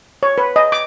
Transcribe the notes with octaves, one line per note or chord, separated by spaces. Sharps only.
C#5
B4
D#5
D6